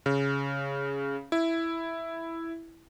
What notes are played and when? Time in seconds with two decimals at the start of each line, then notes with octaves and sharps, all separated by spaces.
0.06 C#3
1.32 E4